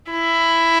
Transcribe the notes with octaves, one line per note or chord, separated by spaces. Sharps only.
E4